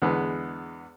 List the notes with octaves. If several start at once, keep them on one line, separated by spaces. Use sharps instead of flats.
E2 D3 G#3 B3